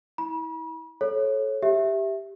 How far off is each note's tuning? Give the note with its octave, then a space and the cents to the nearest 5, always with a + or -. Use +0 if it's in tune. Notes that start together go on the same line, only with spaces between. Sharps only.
E4 -35 B5 -40
A4 -25 C#5 -20
G4 +0 E5 +0